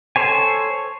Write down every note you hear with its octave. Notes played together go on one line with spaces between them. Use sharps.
A4 C5 C#5 G#5